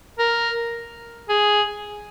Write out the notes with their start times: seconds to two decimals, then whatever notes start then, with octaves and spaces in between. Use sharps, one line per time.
0.19 A#4
1.29 G#4